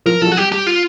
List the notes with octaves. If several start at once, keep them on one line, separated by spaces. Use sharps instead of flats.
F3 A#4
F3 F#3 A4
F#4
G3 G4
G4
F4